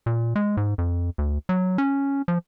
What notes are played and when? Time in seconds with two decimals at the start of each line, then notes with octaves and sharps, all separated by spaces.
0.06 A#2
0.36 G#3
0.57 G#2
0.78 F2
1.18 D2
1.49 F#3
1.78 C#4
2.28 F3